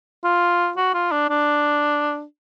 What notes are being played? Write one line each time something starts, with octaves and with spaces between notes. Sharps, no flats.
F4
F#4
F4
D4
D4